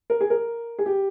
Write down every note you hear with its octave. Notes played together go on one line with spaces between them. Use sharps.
A#4
G#4
A#4
G#4
G4